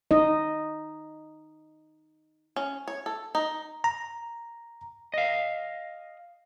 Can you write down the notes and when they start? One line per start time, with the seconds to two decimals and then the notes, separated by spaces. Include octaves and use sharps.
0.11 D#4 D#5
2.56 C#4
2.88 C#5
3.06 A4
3.35 D#4
3.84 A#5
5.14 D#5 F5